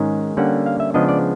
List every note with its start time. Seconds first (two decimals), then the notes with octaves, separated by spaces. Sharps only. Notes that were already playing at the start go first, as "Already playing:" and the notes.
Already playing: G#2 D#3 G#3 C#4
0.37 D3 G3 A#3 C#4 F#5
0.66 F5
0.80 E5
0.94 C#3 F3 G#3 B3 D4 D#5
1.09 D5